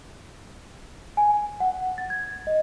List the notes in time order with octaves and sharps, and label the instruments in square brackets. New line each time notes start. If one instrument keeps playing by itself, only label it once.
[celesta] G#5
F#5
A6
G#6
D#5